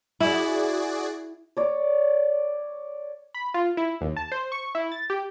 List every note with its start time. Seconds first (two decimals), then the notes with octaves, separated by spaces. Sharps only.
0.20 E4 F#4 G#4 D5
1.57 C#5 D5
3.34 B5
3.54 F4
3.77 E4
4.01 D#2
4.16 A5
4.32 C5
4.52 C#6
4.75 E4
4.92 A6
5.10 G4